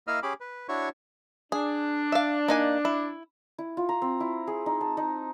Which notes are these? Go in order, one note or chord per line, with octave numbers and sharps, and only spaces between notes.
A#3 E4 D#5 F5 E6 F6
C#4 G4 G#4 B5 D6
B4
D4 E4 F#4 C#5 C#6
D4 G#4
E5 F5
A#3 D#4 G#5
E4
E4
F4
A#5
C4
E4
G#4
D#4
A5
D#4